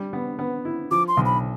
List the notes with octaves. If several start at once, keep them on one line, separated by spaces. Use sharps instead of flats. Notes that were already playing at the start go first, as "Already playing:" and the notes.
Already playing: G3
B3
B3
E4
F3 D6
C6
B1
B5